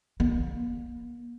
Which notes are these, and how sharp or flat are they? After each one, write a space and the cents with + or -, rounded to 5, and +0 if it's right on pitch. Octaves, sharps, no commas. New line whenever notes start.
A#3 +40